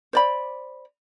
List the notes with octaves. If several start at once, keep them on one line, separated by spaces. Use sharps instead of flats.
C5 D5 B5